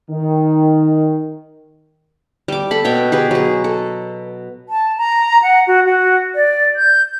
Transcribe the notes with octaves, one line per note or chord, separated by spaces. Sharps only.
D#3
G3 D6
A4 B5
B2 C#5 G5
G4 G#4 B4
F#3 G#4
A4
A5
A#5
F#5
F#4
F#4
D5
G6